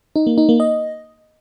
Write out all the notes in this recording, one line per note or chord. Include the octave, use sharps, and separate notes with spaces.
D#4
A#3
D#4
A#3
D#5